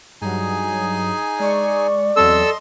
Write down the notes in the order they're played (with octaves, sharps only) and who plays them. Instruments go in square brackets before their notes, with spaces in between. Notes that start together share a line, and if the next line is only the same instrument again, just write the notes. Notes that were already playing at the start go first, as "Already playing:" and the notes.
[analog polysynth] G2 F#3 [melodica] D#4 G#4 G#5
[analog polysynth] G#3 C#6 [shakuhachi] D5
[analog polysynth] E2 F#3 C4 [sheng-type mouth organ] A4 E6 [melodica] D#5 C6